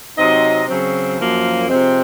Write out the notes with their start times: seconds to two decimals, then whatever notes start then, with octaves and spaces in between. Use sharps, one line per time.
0.17 C3 F#3 C4 D#4 D#5
0.68 C#3 F#3 C4
1.19 F#2 F3 A#3
1.68 C3 F3 G#3 C4